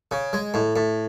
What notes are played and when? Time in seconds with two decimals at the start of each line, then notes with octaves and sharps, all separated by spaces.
0.11 C#3
0.33 G#3
0.54 A2
0.76 A2